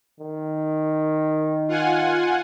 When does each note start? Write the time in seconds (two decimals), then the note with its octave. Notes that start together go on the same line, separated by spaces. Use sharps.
0.20 D#3
1.68 F4 F#5 G#5